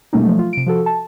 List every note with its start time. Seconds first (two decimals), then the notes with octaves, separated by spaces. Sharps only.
0.13 B2 G3 A3 A#3 C#4 D#4
0.24 F3 F#3 A3
0.39 F4
0.53 C3 D7
0.66 F3 F#4 A4
0.86 A5